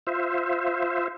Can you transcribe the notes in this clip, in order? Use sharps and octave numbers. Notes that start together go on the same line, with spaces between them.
F4 C5 E5